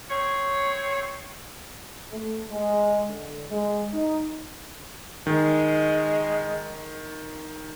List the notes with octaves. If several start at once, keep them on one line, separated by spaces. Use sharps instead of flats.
C4 C#5
A3
G#3
D3
G#3
D#4
D#3 G#3